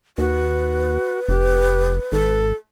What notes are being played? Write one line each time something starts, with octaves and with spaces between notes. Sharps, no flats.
D#2 F#4 B4
F1 G4
G#1 A4